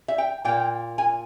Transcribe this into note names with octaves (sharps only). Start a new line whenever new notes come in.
E5
G5
A#2 A#3 G5
G#5